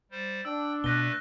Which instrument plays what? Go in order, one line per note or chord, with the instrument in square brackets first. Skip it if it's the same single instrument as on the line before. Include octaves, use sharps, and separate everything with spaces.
[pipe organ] G3 C5
[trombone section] D4 [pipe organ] G5 [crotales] E6
[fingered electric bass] B2 [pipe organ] A3 B4 [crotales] F#6 A#6 G7